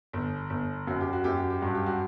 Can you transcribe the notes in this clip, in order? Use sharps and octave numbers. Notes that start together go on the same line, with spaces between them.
G1
G1
F#2 F#4
G4
F#4
F#2 G4
F#4
G4
G2 F#4
G4
F#4